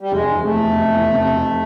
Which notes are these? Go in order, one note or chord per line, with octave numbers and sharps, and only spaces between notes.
G3
F1 G#3
F1
A3
E2
F1
E2
C3
F1